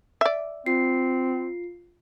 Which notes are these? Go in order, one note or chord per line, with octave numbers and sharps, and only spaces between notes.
D5 E5
C4 F4 C7